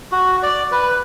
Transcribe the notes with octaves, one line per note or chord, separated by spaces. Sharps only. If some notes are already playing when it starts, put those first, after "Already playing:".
F#4
D5
B4